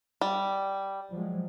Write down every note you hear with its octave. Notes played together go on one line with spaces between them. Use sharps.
G3
F3 F#3 G#3